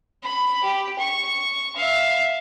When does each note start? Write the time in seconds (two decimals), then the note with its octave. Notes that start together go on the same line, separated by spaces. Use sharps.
0.23 B5
0.63 G4
0.99 C#6
1.76 E5 F5